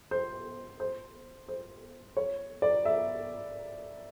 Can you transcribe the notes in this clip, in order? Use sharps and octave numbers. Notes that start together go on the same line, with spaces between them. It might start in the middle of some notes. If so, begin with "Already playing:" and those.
C5
C5
C5
C#5
D5
E5